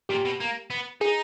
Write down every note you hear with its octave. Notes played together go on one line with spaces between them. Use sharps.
A#2 G4
B2
A#3
B3
D#4 G#4